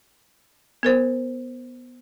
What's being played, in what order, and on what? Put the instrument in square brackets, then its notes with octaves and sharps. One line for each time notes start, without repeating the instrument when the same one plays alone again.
[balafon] B3 A#4 C5